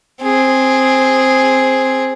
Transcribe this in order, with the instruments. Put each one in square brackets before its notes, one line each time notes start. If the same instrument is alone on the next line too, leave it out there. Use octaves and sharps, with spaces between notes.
[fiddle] C4 G#4